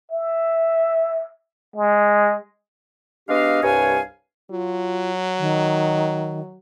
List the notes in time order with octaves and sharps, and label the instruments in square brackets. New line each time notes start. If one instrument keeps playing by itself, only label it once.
[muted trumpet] E5
G#3
[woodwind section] G#3 B3 D4 G4 D#5 F5
C2 G2 B4 C#5 F5 G#5
[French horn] F#3 [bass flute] F4
[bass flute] D#3